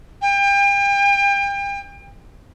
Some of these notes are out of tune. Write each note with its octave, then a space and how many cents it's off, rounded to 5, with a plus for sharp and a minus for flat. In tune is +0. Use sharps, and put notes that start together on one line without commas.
G5 +35